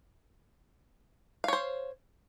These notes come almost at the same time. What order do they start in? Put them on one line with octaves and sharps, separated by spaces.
F5 C#5 C5